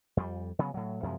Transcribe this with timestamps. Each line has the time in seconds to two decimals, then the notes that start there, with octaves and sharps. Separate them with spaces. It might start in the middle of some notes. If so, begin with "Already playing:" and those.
0.17 F2 G3
0.59 C#3 F#3 B3
0.74 A2 F#3
1.03 F#2 C3 F3 G#3